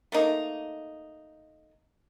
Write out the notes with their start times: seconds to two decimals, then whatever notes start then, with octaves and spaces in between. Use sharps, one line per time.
0.12 A3 A#3 D#4